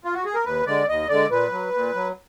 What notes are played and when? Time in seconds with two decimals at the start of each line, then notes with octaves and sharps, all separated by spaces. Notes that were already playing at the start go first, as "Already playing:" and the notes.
0.04 F4
0.14 F#4
0.25 G#4
0.35 A#4
0.45 D#2 B4
0.66 D3 G#3 D5
0.88 D#2 D#5
1.09 D3 G#3 D5
1.30 A#2 B4
1.52 F#3
1.74 A#2
1.95 F#3